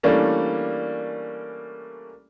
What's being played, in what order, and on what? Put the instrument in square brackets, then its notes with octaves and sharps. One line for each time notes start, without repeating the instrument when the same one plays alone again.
[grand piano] E3 G3 A3 A#3 C#4 D4